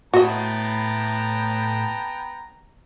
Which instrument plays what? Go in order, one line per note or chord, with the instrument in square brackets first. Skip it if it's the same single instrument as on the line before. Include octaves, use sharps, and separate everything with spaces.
[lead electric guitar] A2 E4 [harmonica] B3 G5 A5 [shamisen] F#4 D#5 [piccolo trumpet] A#5